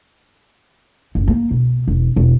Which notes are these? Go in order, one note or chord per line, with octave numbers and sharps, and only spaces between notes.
F#1
A#3
B2
E1
E1